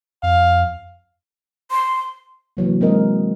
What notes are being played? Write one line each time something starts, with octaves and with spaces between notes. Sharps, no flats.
F2 F5
C6
C3 E3 F#3 A#3
G#3 C4 A#4 D#5